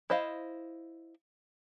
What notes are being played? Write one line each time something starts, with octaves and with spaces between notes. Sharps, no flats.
E4 C5 D#5 F5